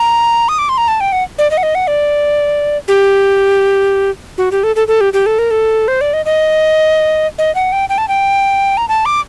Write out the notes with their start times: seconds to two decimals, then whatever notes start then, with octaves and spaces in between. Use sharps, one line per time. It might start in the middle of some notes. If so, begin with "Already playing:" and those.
Already playing: A#5
0.49 D#6
0.59 D6
0.69 C6
0.78 A#5
0.88 A5
1.00 G5
1.12 F#5
1.38 D5
1.51 D#5
1.57 F#5
1.63 D#5
1.75 F#5
1.87 D5
2.88 G4
4.38 F#4
4.51 G4
4.63 A4
4.76 A4
4.88 A4
5.01 G4
5.13 G4
5.26 A4
5.39 A#4
5.51 A4
5.88 C5
6.01 D5
6.13 D#5
6.25 D#5
7.38 D#5
7.55 F#5
7.72 G5
7.89 G5
7.98 A5
8.08 G5
8.77 A#5
8.88 A5
9.06 D6